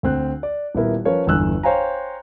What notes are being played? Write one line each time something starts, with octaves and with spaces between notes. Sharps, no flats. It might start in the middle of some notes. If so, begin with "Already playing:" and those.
D2 C4 F#6
D5
D#1 B3 E4 A#4
F3 C#4 A#4 B4 C#5 F5
G1 E2 D3 E6 F#6
C5 C#5 F5 G5 G#5 A#5